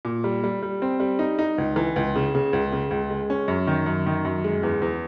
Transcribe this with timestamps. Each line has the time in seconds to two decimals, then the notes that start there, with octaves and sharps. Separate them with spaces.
0.05 A#2
0.24 G3
0.44 G3
0.62 G3
0.82 C4
1.00 G3
1.19 D#4
1.39 D#4
1.58 C#2
1.76 E3
1.96 C#2
2.15 C#3
2.35 C#3
2.53 C#2
2.72 C#3
2.91 C#2
3.10 G#3
3.30 C#4
3.48 F#2
3.67 D#3
3.86 F#2
4.06 D#3
4.25 F#2
4.44 G#3
4.63 E2
4.82 E2